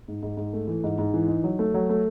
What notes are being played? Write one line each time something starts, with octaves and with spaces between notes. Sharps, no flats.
G#2
G#2
G#2
A3
E3
G#2
G#2
E3
D#4
F#3
A3
F#3
A3